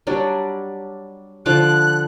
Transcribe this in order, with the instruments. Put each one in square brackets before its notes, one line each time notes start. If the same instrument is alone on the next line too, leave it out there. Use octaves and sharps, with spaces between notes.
[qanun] F#3 G3 D4
[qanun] D3 F3 D6 [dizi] F#6